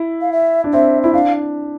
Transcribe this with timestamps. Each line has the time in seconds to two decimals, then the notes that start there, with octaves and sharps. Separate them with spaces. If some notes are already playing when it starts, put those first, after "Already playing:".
Already playing: E4
0.21 F5
0.33 E5
0.64 D4
0.73 C4 E5
1.03 E4 E5
1.14 D4 F5